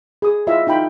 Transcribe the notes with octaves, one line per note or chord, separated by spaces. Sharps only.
G#4 D#6
E4 F4 D#5 E5
D#4 F4 G5 B5